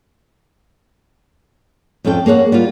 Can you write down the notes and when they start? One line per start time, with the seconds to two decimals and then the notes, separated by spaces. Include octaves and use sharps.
2.05 F2 C#4 A4 G5
2.26 A#3 G#4 C#5 F#5
2.52 G3 A#3 F4